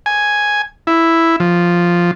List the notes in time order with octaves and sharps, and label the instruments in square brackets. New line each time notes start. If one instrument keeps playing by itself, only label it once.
[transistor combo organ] G#5
E4
F3